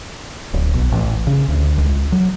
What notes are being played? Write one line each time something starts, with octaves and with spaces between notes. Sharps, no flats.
D1
B1
A1
C#3
D2
C#2
F#3